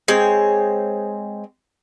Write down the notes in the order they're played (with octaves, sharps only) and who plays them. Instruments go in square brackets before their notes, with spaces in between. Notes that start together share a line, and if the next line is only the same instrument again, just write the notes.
[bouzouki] G#3 C4 C#5